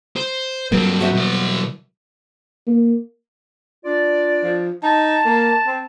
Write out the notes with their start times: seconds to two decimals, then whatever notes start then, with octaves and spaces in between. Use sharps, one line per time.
0.16 C5
0.72 G2 F#3 G3 A#3 C4 A#4
1.00 F#4 C5 E5
1.14 B2 E4
2.67 A#3
3.85 D4 F4 D5
4.44 F3
4.83 D#4 A5
5.26 A#3
5.67 C4